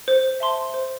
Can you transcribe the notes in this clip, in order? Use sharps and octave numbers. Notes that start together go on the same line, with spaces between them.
C5
E5 A5 C6
C5